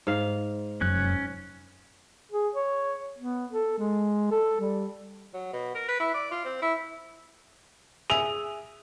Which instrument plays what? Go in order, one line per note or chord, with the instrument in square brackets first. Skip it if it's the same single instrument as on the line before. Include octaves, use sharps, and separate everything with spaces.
[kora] G#2 F5
[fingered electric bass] F1 F#2 [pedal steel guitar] C#4 F#6
[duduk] G#4
C#5
B3
A4
G#3
A4
G3
[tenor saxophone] F#3
B2
A#4
B4
E4
D5
F4
C4
E4
[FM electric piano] G#4 E5 D#6 [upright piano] F7